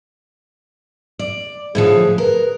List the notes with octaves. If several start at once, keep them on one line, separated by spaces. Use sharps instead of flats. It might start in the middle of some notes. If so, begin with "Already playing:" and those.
D5
A2 D3 F3 G#4
A#4 B4